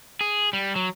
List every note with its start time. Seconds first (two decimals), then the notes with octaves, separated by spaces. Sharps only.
0.21 G#4
0.53 G3
0.76 F#3